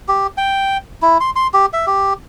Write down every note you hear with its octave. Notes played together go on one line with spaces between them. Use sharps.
G4
G5
E4
C6
C6
G4
E5
G4